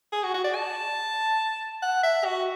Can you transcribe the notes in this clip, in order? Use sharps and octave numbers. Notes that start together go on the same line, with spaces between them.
G#4
F#4
F#4
D5
A5
F#5
E5
F#4